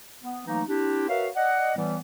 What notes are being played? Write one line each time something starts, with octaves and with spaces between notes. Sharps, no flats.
B3
E3 F#3 A3 A#3 D#4
C4 D4 E4 G4
F#4 A#4 B4 C#5 E5 F5
D5 D#5 F#5
A2 E3 G3 B3